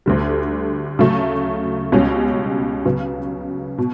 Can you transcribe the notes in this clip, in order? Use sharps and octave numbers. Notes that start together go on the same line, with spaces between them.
D2 D3 G3
C#3 F#3 A3
C#2 B2 G3 C#4
C#3 F#3 B3
B2